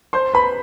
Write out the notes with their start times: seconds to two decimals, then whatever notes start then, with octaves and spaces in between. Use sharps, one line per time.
0.13 C5 C6
0.34 B4 B5